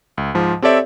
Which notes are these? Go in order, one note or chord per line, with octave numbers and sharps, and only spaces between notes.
C#2
G#2 F3
C4 G4 A4 C#5 D5 E5